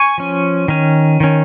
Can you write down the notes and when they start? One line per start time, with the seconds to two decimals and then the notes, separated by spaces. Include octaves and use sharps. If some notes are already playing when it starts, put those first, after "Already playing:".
Already playing: G#5 C#6
0.18 F3 C#4
0.68 D#3 C#4
1.20 D#3 C#4